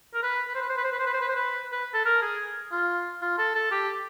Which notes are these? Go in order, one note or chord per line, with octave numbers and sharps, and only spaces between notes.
A#4
B4
B4
C5
B4
C5
B4
C5
B4
C5
B4
C5
B4
C5
B4
B4
A4
A#4
G#4
F4
F4
A4
A4
G4